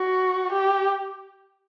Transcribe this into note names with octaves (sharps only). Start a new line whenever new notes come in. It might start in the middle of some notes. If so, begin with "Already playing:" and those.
Already playing: F#4
G4